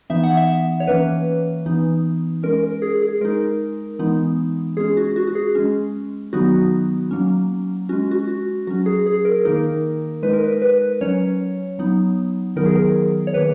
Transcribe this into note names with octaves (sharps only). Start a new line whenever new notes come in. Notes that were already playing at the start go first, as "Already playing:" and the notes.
E3 B3 D#4 E5
F#5
E5
C#5
E3 A#3 C#4 B4
E3 B3 D#4
G#3 C#4 A#4
A#4
G#4
G#4
G#3 D#4 A#4
E3 G#3 B3 D#4
G#3 C#4 G#4
F#4
F#4
F#4
G#4
G#3 C#4
D#3 F#3 B3 D#4 F#4
F#3 A#3 C#4
G#3 C#4 F#4
F#4
F#4
F#3 C#4 F#4
G#4
G#4
A#4
D#3 A#3 D#4 A#4
G#3 D#4 B4
A#4
B4
B4
F#3 C#4 C#5
F#3 B3 D#4
D#3 F#3 B3 D#4 A#4
G#4
A#4
C#5
D#3 A#3 B4